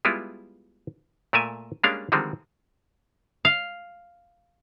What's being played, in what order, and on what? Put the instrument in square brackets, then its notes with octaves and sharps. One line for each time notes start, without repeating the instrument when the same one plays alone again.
[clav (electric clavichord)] G3 G#3 B3 E4 F4
A#2 A3 A#4 E5 G#5
G3 G#3 A#3 C#4 D4 F5
D3 D#3 F3 G3 G#3 C4
[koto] F5